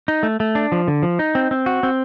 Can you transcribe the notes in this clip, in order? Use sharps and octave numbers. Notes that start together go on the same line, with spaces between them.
D#4
A3
A3
D4
F3
D3
F3
D#4
C4
C4
F#4
C4